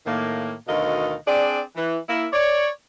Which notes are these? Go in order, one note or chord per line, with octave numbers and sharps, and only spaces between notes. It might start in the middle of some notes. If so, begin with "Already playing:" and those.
A2 D#3 A#3
D2 B2 D#3 A4 D#5 F5
C4 D4 G#4 D5
E3
A#3 E4
C#5 D5